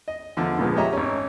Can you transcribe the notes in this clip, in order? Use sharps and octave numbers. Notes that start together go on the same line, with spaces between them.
D#5
E2 D3 F3
C#2 A#2 F3 G#3 B3
G4 C#5 D#5 E5 A#5
G#1 C#4